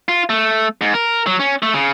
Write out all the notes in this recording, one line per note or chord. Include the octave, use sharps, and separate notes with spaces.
F4
A3
G#2
A#4
F#3
C#4
A3
C#3